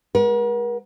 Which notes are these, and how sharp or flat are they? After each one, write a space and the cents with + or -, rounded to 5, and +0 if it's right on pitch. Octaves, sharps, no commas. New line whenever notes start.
G#3 +0 A#4 +45 F#5 +0